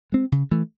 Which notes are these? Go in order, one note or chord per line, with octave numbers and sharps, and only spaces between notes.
G#3 C4
C#3
E3 A3